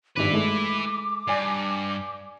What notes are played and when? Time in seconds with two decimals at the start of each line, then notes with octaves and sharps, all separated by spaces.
0.17 G#1 G2 E4 B4 D6
0.33 G#3 A3
1.28 G2 D5 G#5